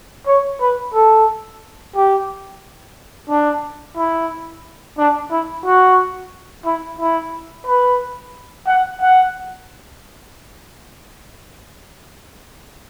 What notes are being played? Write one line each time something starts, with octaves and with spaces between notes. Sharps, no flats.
C#5
B4
A4
G4
D4
E4
D4
E4
F#4
E4
E4
B4
F#5
F#5